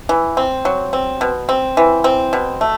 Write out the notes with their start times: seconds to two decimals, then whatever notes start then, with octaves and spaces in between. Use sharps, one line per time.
0.09 E3
0.37 C4
0.65 F#3
0.93 C4
1.21 B2
1.49 C4
1.77 E3
2.04 C4
2.33 B2
2.61 A3